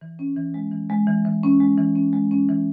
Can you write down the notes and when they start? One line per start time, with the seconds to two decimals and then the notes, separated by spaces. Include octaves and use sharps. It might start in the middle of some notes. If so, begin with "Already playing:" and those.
0.01 E3
0.19 C#4
0.36 E3
0.54 G#3
0.72 E3
0.90 G#3
1.07 E3
1.25 E3
1.43 C#4
1.60 G#3
1.78 E3
1.96 C#4
2.13 G#3
2.31 C#4
2.49 E3